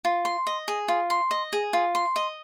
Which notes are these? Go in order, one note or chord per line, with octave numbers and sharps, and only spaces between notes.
F4
C6
D#5
G#4
F4
C6
D#5
G#4
F4
C6
D#5